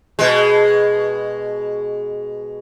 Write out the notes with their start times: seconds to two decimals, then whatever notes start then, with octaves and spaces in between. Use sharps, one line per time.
0.19 B2 G#3